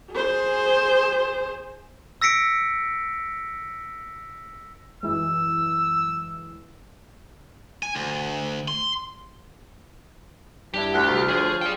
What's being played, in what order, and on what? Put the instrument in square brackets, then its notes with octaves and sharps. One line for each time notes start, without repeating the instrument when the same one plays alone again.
[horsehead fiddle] G#4 C5
[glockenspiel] E6 A#6 B6 C#7 D7
[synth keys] F#2 E3 G#3 [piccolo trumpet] E6
[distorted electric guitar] G#5
D2
C6
[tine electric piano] G2 D4 E4 [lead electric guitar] G4
[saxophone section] D2 [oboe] F#5
[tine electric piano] C2 A3 [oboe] F4
[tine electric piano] F3 C#5 G6 [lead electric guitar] G#4
[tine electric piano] G#4 F5 [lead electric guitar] D5 G5